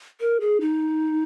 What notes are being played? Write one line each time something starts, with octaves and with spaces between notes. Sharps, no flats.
A#4
G#4
D#4